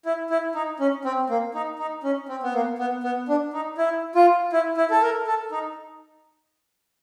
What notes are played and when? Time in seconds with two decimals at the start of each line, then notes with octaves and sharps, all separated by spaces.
0.06 E4
0.30 E4
0.55 D#4
0.80 C#4
1.05 C4
1.30 A#3
1.55 D#4
1.79 D#4
2.04 C#4
2.29 C4
2.43 B3
2.54 A#3
2.79 B3
3.04 B3
3.29 D4
3.53 D#4
3.78 E4
4.15 F4
4.53 E4
4.77 E4
4.91 A4
5.02 A#4
5.27 A4
5.52 D#4